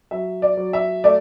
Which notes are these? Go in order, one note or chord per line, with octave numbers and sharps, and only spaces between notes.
F#3 E5
D5
F#3
E5
A3 D5